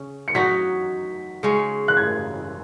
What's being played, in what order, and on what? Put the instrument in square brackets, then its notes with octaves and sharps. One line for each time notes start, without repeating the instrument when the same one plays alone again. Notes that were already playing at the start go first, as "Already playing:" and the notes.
Already playing: [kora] C#3 C#4
[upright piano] C#7
[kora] F#3 D#4 F#4 [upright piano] B6
[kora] C#3 G#3 C#4
[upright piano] F#6
G#6